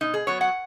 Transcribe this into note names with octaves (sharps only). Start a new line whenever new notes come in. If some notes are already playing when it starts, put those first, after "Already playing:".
B2 D#4
G#4
F#3 B3 C#5
F#5